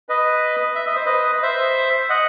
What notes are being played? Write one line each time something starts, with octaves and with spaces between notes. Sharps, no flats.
B4 D#5
E5
D#5
C5
B4 D#5
C5 E5
D#5 F#5